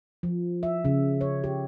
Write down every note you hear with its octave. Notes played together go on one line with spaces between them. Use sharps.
F3
E5
C#3
C#5
G4